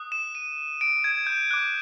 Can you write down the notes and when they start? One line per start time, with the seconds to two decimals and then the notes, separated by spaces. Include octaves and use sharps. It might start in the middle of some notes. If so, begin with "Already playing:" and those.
Already playing: D#6 F#6
0.12 E7
0.35 D#7
0.81 D7
1.04 G#6
1.27 G6
1.51 D6 F#6